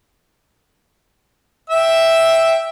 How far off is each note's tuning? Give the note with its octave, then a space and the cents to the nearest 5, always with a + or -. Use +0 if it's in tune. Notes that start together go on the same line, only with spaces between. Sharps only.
E5 -5 G5 +0 E6 +0